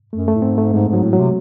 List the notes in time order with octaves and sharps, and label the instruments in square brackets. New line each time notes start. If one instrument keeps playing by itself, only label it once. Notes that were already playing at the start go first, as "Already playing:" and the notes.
[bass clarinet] F#2 [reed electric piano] A3
[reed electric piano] A3
[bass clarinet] A2
[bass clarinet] G#2 [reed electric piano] C4
[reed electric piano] A3
[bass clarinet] G#2 [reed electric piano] G#3
[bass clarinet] G#2
[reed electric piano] F#3
[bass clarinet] A2
[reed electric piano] F#3
[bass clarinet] C3